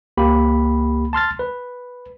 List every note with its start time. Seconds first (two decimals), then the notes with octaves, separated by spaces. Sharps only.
0.18 C#2 A#3 G4 B5
1.13 A5 C6 F6 A6
1.39 B4